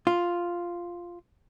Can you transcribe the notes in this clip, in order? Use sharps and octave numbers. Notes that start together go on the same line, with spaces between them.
F4